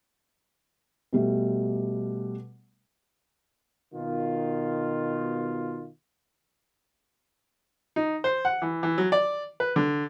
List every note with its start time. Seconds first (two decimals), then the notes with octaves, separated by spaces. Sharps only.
1.13 B2 G3 A3
3.94 B2 D#3 F4
7.96 D#4
8.24 C5
8.45 F#5
8.62 E3
8.83 E3
8.98 F#3
9.12 D5
9.60 B4
9.76 D3